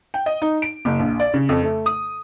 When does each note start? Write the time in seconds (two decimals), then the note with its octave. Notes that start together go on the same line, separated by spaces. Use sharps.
0.14 G5
0.26 D#5
0.42 D#4
0.62 D7
0.85 F#1
0.99 A#1
1.20 D5
1.34 C#3
1.49 F2
1.63 A3
1.86 D#6